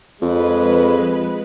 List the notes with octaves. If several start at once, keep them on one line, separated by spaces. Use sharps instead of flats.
F2 F3 G#3 B4